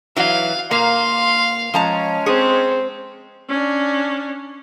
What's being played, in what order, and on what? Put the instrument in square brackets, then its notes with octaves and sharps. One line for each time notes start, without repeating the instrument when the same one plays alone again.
[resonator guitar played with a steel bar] E3 F#3 [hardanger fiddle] F5
[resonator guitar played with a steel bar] A#2 A#3 [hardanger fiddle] F5 [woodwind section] C6
[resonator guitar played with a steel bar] F3 A5 A#5 [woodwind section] G#3 C#4
[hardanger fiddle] C4 [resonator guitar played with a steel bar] G#4
[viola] C#4 D4